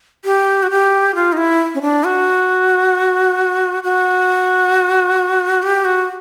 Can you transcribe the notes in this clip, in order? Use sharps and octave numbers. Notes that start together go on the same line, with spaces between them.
G4
F#4
G4
F4
D#4
E4
C#4
D4
F#4
F#4
G4
F#4